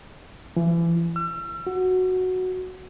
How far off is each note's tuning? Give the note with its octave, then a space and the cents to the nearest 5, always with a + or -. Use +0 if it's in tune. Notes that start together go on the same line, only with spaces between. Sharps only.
E3 +35
E6 +40
F#4 -5